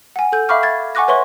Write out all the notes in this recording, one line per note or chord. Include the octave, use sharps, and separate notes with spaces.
F#5 G#5
A4 G6
E5 F5 B5 C#6 D6 F6
G#6 A6
F#5 G#5 C#6 D6 F#6 A#6
B4 C#5 E5 C6 C#6